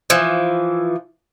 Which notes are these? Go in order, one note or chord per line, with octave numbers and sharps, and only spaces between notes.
E3 F3